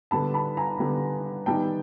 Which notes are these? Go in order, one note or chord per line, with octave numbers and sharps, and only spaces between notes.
D3 G3 B3 A5 B5
A5 B5
G#5 A#5
D3 G3 B3
D#3 G3 B3 G5 A5